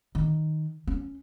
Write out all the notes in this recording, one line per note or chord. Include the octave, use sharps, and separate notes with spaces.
D#3
C#4